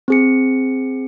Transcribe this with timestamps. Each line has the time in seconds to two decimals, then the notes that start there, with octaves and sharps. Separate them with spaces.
0.08 C4 G#4 C#7